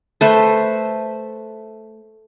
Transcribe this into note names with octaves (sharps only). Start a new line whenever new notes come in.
A3 B4 C5